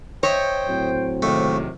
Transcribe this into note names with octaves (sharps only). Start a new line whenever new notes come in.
C5 C#5 D#5 E5 G5
A2 F#3 C4
D#2 G#2 C3 D#3 A3